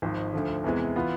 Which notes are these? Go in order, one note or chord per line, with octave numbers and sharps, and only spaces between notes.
G#1 G#2 F3
D2 D3 F3
E2 C3 E3 G#3
E3 B3 F4